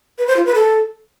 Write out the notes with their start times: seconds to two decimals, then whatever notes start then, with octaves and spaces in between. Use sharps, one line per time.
0.18 B4
0.27 C5
0.36 F4
0.46 B4
0.55 A4